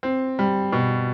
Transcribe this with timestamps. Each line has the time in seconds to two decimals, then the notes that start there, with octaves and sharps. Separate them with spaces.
0.03 C4
0.39 G3
0.73 B2